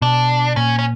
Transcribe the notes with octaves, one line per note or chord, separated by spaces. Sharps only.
B2 D4
A#2 C#4
C#4